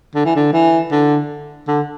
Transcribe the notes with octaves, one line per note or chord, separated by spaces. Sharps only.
D3
E3
D3
E3
D3
D3